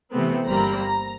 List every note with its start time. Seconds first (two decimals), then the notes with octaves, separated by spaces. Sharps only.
0.11 C3 E3 A3 B3 C4
0.48 G1 G3 A#3 C4 A#5 B5
0.79 A#5